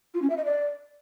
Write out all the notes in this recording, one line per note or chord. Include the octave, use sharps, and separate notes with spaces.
F4
C#4
E5
D#5
D5